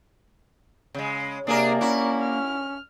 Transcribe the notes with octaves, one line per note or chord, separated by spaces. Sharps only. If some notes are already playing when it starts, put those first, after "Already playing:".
C#3 G#3
C3 A#3 D4 G#4 A#4 D5 A#5
C#4 E4 F#4
F6